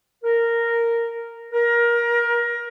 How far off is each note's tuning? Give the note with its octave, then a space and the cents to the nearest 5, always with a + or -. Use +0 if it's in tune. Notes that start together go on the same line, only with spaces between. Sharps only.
A#4 -5
A#4 +20